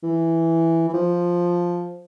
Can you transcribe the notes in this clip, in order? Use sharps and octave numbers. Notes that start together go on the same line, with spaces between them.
E3
E3
F3